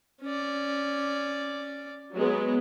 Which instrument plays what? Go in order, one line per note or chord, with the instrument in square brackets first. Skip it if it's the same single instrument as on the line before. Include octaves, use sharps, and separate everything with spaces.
[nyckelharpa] C#4 D5
[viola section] F#3 G#3 B3